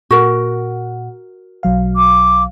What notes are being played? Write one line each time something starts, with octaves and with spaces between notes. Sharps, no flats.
A#2 F#4 A#4 F#5
B1 F#3 F5
D6